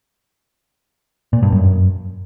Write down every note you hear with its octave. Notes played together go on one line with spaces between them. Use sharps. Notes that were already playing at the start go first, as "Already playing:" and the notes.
A#2
G2
F#2